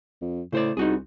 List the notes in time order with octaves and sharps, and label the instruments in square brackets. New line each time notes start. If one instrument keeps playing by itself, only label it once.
[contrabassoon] F2
[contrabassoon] A2 [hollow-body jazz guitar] C#3 C5 D5
[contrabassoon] C2 [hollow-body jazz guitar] D#4 F#4 G#4